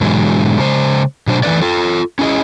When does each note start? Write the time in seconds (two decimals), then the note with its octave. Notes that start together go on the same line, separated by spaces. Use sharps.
0.01 G#2 B2 D3 E3 F#3 G#3
0.59 C#3 G#3 C5
1.27 B2 F#3 D4 C5
1.43 E3 A3 B3 B4 D5
1.62 F4 A4
2.19 C#4 E4 G#4 D#5